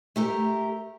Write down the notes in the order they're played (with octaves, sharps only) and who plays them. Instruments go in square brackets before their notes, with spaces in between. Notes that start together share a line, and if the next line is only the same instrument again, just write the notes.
[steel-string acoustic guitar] A3 G4 A#4